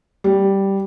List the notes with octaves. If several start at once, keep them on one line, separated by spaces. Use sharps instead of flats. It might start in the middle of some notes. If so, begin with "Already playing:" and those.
G3